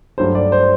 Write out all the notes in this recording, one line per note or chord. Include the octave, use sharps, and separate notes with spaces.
G2 F#3 A3 C5
D5
C5